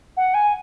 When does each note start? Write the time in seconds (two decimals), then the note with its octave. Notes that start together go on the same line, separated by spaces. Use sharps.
0.17 F#5
0.34 G#5